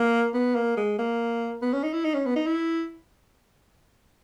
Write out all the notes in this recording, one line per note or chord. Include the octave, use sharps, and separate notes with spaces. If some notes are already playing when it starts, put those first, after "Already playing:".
Already playing: A#3
B3
A#3
G#3
A#3
B3
C#4
D#4
E4
D#4
C#4
B3
D#4
E4